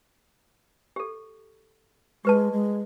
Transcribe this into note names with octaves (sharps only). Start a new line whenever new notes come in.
G4 A4
G#3 G4 B4 A5
G#3